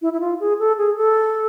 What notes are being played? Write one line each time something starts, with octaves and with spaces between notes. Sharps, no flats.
E4
E4
F4
G#4
A4
G#4
A4